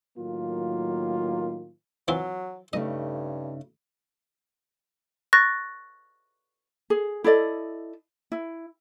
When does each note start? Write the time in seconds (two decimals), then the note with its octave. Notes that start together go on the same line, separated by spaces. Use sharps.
0.17 A2 D#3 F#3 A#3 F4
2.08 E3 F#3 C4 F4
2.73 G2 C#3 A3 D#4 D#5
5.33 C#6 F#6 A6 A#6
6.90 G#4
7.24 E4 A4 D5 D#5
8.32 E4